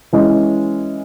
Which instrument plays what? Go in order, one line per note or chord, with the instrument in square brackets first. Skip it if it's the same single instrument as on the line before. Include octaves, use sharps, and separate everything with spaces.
[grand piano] E3 G#3 C#4